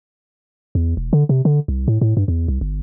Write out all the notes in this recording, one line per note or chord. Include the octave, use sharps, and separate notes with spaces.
E2
E1
D3
C3
D3
C2
A2
A2
G2
E2
C2
G1